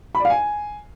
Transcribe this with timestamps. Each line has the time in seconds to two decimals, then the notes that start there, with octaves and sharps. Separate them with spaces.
0.15 B5
0.20 D5
0.25 F5
0.30 G#5